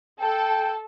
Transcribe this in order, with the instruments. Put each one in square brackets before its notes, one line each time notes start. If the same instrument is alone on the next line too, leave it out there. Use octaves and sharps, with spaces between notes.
[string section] A4 [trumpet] G5